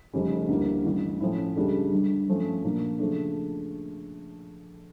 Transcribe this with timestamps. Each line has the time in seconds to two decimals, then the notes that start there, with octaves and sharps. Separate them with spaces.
0.13 F1 F2 C#3 G3 C#4
0.48 D2 D3 G3 A#3 E4
0.84 A1 G2 E3
1.20 A2 F3 C#4 E4
1.56 C#2 C#3 G3 D4 A4
1.92 G1 G2 D3
2.28 G2 F3 A3 C#4
2.64 A#2 F3 A#3 D4
2.99 C#3 F3 A3 D4